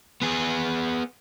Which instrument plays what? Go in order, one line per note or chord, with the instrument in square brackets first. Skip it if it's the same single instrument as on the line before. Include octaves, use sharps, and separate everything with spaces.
[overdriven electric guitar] B3 G#4